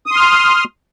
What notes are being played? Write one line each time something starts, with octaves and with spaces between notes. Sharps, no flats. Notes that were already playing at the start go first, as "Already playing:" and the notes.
C6 D#6 F6